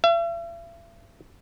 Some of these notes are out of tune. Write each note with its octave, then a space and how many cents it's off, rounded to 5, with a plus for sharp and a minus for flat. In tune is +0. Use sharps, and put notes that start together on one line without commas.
E5 +45